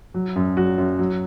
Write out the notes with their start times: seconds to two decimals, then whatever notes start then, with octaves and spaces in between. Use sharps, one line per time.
0.14 F#3
0.36 F#2
0.57 F#3 F#4
0.78 F#2
0.99 F#3